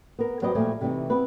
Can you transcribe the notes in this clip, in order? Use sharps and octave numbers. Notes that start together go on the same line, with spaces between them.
B3 A#4
F#3 G4 B4 C5 D5 D#5
A#2 F3 G3 A3 G#5
C3 E3 G3 A3 D#4
B3 C4 B4